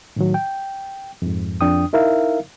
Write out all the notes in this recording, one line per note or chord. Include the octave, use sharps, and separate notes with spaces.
A2 D#3 F#3
G5
F2 G#2
F2 D4 G5 D#6
D#4 E4 A#4 E5 F5